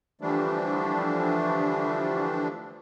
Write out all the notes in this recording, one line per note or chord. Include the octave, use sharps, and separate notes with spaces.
D3 E3 F3 G3 A3 D4